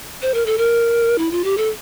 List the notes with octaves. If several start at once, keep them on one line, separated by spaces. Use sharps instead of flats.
C5
A#4
A4
A#4
E4
F4
G4
A4